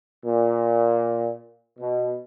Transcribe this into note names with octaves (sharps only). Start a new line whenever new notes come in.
A#2
B2